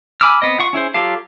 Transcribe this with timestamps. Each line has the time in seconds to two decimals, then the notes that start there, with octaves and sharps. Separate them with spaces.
0.21 G#5 B5 D6 E6 F6
0.42 B3 C4 D#5
0.59 F4 F#5 C#6
0.73 C#4 E4 G#4 C5
0.94 F#3 F4 G4 A4 F5